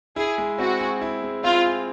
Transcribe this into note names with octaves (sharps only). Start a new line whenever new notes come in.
E4 G#4
G#3
C4 F#4
G#4
E4
G#3
C4 F4
G#4